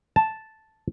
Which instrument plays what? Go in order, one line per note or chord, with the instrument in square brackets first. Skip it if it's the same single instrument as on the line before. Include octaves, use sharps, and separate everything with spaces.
[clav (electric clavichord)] A5